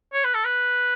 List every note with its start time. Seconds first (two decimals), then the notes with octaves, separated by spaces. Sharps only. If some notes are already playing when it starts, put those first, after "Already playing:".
0.13 C#5
0.24 B4
0.34 A4
0.45 B4